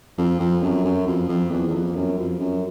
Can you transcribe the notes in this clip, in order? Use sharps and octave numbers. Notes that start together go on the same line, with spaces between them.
F2
F2
F#2
F#2
F2
F2
E2
E2
F2
F#2
F2
F#2